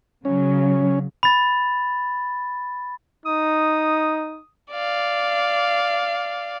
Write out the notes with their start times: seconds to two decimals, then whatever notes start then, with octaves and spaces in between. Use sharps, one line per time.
0.25 C#3 F#3 C#4
1.23 B5 A6
3.26 D#4 D#6
4.72 D5 F5